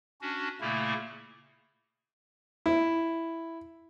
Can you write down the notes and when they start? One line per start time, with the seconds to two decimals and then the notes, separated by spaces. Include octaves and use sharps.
0.21 C#4 D4 F#4
0.61 A#2 C#3 A3 A#3 E4
2.66 E4